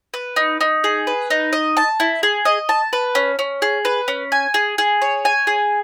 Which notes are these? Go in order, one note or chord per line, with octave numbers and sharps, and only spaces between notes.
B4
D#4
D#4
G#4
B4
D#4
D#5
A5
E4
G#4
D#5
A5
B4
C#4
C#4
G#4
B4
C#4
G#5
G#4
G#4
C#5
G#5
G#4